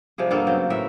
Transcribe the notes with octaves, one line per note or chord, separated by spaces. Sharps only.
C3 F3 G3 G#4
G2 A#3 B3 A4
C#3 F#3 C4
A2 A#4 B4 E5